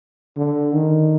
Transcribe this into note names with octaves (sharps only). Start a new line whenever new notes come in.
D3
D#3